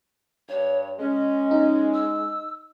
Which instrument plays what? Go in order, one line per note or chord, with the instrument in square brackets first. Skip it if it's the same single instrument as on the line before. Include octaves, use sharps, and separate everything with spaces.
[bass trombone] G2 [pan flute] C#5
[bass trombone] G#3 [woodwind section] C#4 [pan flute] D#5
[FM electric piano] D#4
[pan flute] E6